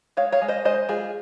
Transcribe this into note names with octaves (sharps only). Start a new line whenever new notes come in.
G#3 C#5 F5
C#5 F5
G#3
C5 D#5
G#3 C5 D#5
G#3 F4 G#4